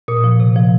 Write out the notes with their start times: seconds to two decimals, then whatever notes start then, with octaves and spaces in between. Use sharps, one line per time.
0.08 A#2 D#6
0.24 F3
0.40 C3
0.56 F3